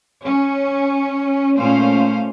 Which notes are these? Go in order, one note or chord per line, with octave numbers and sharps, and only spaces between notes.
C#4
A#2 A3 C#4 C5 F5